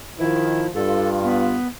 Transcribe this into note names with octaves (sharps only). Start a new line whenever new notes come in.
D#3 F3 E4
G2 F4 A4
B3